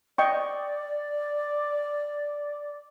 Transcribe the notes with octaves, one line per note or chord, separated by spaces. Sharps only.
D5 D#5 G5 C#6